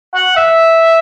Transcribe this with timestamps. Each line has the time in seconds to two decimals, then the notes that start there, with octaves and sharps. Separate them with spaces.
0.15 F#5
0.36 E5